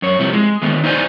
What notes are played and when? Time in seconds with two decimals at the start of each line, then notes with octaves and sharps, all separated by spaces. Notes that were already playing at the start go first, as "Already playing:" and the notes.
0.02 F#2 C#5
0.19 C3 F3 G3 C4 E4
0.33 G#3
0.62 D3 D#3 A3 B3
0.84 D#4 E4 C5 D5 G#5